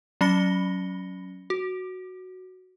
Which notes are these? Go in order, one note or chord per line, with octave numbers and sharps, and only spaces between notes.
F#3 C#4 B5 A#6 C#7 G7
F#4